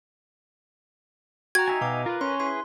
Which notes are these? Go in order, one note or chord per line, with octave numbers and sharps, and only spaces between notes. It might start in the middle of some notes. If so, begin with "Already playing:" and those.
F#4 G5 A#5 G#6
D#4 E5 G#5 A#5
B2 F5 D6
F4 A#4 B4
C#4 C6
E4 G#4 B4 C6